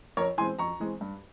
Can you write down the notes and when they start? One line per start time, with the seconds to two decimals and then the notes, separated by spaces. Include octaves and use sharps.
0.17 F2 A#4 C#5
0.38 E3 G#3 C4 G#5 C6
0.59 F2 A#5 C#6
0.80 E3 G#3 C4
1.01 G2